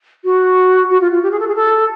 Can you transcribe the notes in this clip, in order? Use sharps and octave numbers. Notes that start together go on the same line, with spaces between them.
F#4
F#4
F4
F4
G4
G#4
A4
G#4
A4